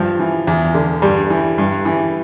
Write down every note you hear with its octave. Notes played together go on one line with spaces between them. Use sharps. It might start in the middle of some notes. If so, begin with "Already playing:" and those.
Already playing: G2 F3
E3
E2
D3
G2 G3
E3
G2
E3